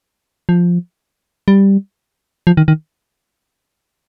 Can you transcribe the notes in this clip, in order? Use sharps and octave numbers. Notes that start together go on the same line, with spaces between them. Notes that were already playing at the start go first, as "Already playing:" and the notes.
F3
G3
F3
D#3
D#3